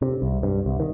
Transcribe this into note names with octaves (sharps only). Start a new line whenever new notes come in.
C3
C2
G2
C2
D#3